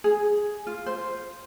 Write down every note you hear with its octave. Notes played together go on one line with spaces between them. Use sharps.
G#4
F4
C5